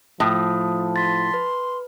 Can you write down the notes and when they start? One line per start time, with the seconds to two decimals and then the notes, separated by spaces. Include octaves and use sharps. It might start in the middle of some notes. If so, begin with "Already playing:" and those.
0.20 A2 F3 D#6
0.96 C6 A6 B6
1.34 B4